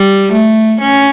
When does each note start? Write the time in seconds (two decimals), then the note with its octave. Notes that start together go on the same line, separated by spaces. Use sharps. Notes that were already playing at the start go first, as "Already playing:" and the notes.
Already playing: G3
0.33 A3
0.81 C#4